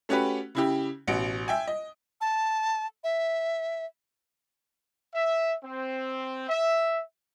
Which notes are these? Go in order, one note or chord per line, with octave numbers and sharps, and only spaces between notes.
A3 C#4 F#4 G4 B4
C#3 E4 G4
A1 B2 F#5 D7
E5 G5 G#5
D#5
A5
E5
E5
C4
E5